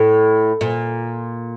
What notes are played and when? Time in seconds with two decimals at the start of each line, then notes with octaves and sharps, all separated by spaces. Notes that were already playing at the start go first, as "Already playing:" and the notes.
Already playing: A2
0.61 A#2